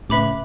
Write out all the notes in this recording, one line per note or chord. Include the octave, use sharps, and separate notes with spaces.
A2 C#3 B4 E5 B5 D6